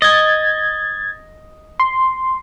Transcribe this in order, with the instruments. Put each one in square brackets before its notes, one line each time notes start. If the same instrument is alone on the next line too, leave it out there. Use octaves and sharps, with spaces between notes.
[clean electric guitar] D#5 [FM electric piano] G#6 A6
[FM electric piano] C6